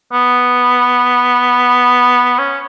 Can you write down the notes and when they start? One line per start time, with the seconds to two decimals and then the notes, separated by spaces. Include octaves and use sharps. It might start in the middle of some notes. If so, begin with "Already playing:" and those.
0.13 B3
2.39 C#4